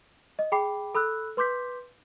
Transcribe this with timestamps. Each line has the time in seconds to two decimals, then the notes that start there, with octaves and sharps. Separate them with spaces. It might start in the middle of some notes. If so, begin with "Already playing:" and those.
0.39 D#5
0.52 G#4 G5 B5 D6 C7
0.95 A4 B5 E6 F#6
1.37 B4 C6 D6 G6 B6